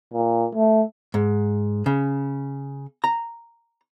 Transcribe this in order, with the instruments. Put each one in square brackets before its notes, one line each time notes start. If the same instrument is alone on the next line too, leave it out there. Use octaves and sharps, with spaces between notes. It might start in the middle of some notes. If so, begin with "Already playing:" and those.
[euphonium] A#2
A3
[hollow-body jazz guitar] G#2
C#3
A#5